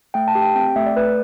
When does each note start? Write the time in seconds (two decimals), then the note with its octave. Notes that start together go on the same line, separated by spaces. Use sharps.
0.14 A3 G5
0.28 A5
0.35 G4
0.42 G5
0.55 C4 G5
0.76 A3 E5
0.86 D5
0.96 A3 B4